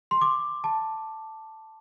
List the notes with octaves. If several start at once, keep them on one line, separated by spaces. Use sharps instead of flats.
C6
D6
A5